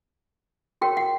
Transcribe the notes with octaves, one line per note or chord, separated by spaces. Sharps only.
F#4 A#4 C#5 G5
F#5